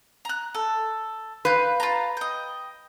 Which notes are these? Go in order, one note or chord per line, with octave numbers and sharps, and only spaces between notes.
A#5 F#6
A4
B4 F5 G6
F4 A5 A#5
D#5 G5